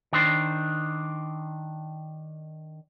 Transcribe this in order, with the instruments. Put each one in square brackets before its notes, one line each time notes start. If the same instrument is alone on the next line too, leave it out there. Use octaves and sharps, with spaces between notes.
[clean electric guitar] D#3 D4 C5